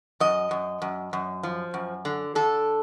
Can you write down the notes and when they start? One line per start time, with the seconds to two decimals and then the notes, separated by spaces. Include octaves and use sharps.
0.20 F#2 D#5
0.51 F#2
0.82 F#2
1.13 F#2
1.43 F3
1.74 F#2
2.05 D3
2.35 D3 A4